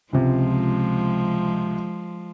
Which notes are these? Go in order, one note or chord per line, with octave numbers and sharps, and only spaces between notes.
C#2 C3 F3 G#3